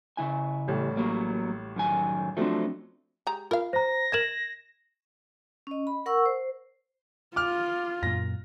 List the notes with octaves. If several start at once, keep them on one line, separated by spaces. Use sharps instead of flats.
C#3 E4 G#5
A1 A2 G3
F#3 A#3
F#2 D#3 G#5
F3 F#3 A3 C4 D4
G#3 G4 A#5
F4 A#4 F5
C5 A#5 A#6
A#4 D#5 G#6 E7 F#7
C#4 D#5
B5
A#4 F#5 C#6 E6
C5
F4 D6 F6
F#2 A#2 A#6